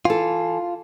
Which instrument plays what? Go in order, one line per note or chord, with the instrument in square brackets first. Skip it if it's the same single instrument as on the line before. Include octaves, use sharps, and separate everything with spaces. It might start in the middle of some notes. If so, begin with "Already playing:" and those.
[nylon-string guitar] E3 A4 [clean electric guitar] F4